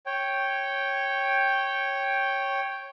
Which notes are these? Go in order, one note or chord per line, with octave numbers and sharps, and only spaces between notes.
C#5 G5